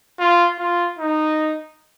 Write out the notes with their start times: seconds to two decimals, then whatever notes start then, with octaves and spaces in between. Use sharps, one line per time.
0.19 F4
0.59 F4
0.99 D#4